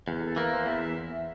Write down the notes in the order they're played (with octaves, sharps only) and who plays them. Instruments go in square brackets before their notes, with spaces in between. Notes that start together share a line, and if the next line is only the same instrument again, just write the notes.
[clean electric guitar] E2
[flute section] G4
A4
[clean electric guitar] E3 A#3 [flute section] A#4
[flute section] C5
[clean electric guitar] E2 [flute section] E5